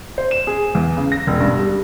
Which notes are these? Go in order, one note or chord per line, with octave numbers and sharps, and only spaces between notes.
C5
E7
G#4
E2
C#3
A#6
E1
G2
G3